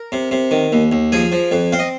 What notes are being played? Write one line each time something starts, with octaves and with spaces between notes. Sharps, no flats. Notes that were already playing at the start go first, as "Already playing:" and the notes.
Already playing: A#4
C3
C3
D#3
D#2
D#2
F3 G#4 G#5
F3
F2
C4 F5
D#5